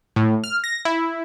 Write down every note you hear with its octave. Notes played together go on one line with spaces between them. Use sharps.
A2
F6
A#6
E4